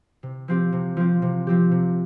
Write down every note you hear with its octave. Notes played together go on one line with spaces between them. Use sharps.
C3
F3 C4 G4
C3
F3 C4 G4
C3
F3 C4 G4
C3